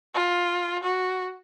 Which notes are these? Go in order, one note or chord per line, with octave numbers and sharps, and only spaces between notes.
F4
F#4